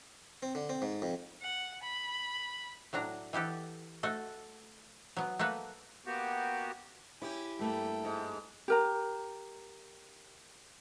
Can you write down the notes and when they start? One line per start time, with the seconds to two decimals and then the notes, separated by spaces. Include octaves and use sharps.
0.43 C4
0.55 D3
0.69 C4
0.82 G#2
1.02 F2
1.42 F#5
1.82 B5
2.93 A2 F#3 D4 A#5
3.33 E3 B3 G4 A4
4.03 A3 F#4 A4
5.17 F#3 B3
5.39 A3 A#3 F#4 B4
6.06 A#3 B3 F#4 G4
7.22 C#4 E4 G4 G#5
7.59 G2 A3 A#3 A4 G5
8.04 G#2
8.68 G4 A#4 A#5